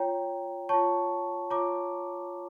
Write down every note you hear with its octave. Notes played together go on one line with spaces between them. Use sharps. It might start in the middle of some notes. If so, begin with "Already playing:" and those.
Already playing: F4 C#5 G5 A#5
F4 C#5 A5 C#6
F4 C#5 A#5 D6